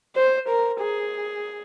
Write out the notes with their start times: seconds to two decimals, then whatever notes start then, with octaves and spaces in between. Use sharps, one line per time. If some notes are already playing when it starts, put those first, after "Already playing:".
0.16 C5
0.49 A#4
0.81 G#4